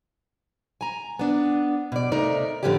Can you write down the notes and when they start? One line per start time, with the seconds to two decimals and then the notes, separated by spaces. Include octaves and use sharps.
0.81 G#5 A#5
1.19 B3 D4
1.92 B2 D5
2.12 C3 A3 D#4 A#4 D5
2.63 A2 D3 F3 A3 C#4 G4